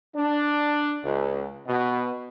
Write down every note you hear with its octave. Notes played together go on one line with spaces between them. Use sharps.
D4
C#2
B2